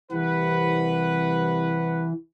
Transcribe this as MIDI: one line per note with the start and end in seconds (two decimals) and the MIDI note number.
0.12 2.11 36
0.12 2.13 52
0.12 2.11 71
0.12 2.11 78